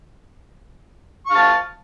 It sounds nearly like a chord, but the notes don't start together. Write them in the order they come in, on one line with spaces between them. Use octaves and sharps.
C#6 F5 A5